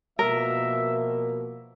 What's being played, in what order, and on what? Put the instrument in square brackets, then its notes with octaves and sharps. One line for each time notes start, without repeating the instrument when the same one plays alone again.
[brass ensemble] B2 F3 A#3 [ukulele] A#4 [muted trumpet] E5